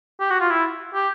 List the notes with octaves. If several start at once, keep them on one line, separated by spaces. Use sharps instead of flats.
G4
F#4
F4
E4
G4